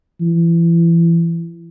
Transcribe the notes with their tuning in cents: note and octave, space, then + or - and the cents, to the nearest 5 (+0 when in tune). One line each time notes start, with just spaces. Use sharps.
E3 +30